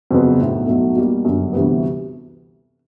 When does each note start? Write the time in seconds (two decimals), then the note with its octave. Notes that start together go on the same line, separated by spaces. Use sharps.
0.10 F1 F2 C#3 F#3 B3
0.39 B1 A2 F#3
0.67 B1 B2 F#3 A3
0.96 B2 G3 A#3
1.25 G1 F#2 D3
1.53 D2 C3 E3 G3 B3